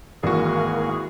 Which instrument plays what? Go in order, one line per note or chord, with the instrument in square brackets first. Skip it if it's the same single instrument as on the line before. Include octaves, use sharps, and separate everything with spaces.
[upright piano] G#1 [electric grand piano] E3 F#4 [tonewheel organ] A#3 [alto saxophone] G#4